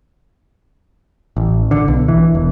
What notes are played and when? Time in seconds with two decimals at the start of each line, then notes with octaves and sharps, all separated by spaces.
1.37 A1
1.71 D3
1.88 B1
2.08 E3
2.35 E1